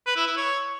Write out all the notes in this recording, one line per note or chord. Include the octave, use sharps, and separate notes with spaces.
B4
E4
E4
C#5